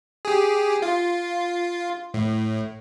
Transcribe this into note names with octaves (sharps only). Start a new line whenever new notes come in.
G4 G#4
F4
A2